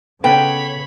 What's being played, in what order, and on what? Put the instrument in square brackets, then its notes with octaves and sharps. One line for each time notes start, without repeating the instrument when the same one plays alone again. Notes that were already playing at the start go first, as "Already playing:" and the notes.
[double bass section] C#3 [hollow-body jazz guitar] B3 A4 B4 [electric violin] C#5 B5 [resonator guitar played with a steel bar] G5